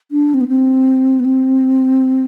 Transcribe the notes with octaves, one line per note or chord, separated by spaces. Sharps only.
D4
C4
B3
C4
B3
C4